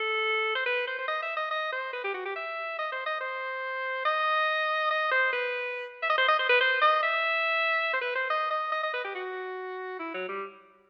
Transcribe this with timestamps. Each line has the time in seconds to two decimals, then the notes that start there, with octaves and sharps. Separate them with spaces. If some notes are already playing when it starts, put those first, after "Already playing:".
Already playing: A4
0.55 C5
0.66 B4
0.87 C5
0.99 C5
1.08 D#5
1.23 E5
1.37 D#5
1.51 D#5
1.73 C5
1.93 B4
2.04 G4
2.14 F#4
2.26 G4
2.36 E5
2.79 D#5
2.92 C5
3.06 D#5
3.21 C5
4.05 D#5
4.91 D#5
5.12 C5
5.33 B4
6.03 E5
6.10 D#5
6.18 C5
6.28 D#5
6.39 C5
6.49 B4
6.61 C5
6.82 D#5
7.03 E5
7.93 C5
8.01 B4
8.16 C5
8.30 D#5
8.51 D#5
8.72 D#5
8.83 D#5
8.94 B4
9.05 G4
9.15 F#4
9.99 E4
10.14 F#3
10.29 G3